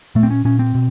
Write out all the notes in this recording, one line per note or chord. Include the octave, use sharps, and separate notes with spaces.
A#2 A3
C4
C#4
A#2 C#4
C4
B2